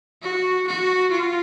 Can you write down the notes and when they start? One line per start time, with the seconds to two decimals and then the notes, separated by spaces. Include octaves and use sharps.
0.22 F#4
0.68 F#4
1.12 F4